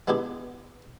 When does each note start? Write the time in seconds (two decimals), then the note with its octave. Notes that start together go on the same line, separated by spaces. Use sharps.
0.08 G#3 B3 D4 E4 G4